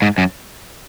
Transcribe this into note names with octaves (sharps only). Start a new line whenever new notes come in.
G#2
F#2